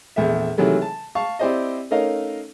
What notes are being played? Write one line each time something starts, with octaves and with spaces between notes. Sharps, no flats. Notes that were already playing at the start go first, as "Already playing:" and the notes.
A#1 E2 A3 E5
C3 D#3 E3 F#3 G#3 A3
A5
F5 A5 C#6
C4 E4 G4 C5 D5 D#5
A3 C#4 D#4 A#4 D#5 F5